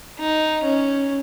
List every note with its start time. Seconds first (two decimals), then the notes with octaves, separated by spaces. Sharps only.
0.20 D#4
0.64 C#4